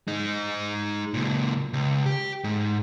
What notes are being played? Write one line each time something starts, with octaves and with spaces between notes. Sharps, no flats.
G#3 D#4
C#2 A#2
C#2
G4
G#2